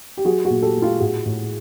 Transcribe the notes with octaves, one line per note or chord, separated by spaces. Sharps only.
G4
F#3 F#4 G#4
F#4 G#4
A#2
G4 A4
A3
F4 G4
A2 F#4 G#4
A2